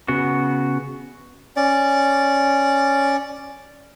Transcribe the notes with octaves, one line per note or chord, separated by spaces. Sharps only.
C#3 B3 F#4
C#4 D5